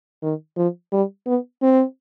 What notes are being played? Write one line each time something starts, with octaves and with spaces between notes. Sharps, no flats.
D#3
F3
G3
B3
C4